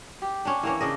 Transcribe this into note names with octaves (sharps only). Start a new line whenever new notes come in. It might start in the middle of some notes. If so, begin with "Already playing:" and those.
G4
C#4 D4
E3 A#3 C#4
C#3 D4 D#5